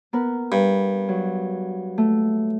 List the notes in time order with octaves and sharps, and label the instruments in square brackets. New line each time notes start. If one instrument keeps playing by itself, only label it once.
[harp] B3 A#4 B4
[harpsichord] G2
[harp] F#3
A3